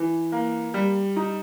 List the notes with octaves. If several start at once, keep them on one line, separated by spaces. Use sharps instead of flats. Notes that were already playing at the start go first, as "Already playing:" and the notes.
Already playing: E3
A#3
G3
D#4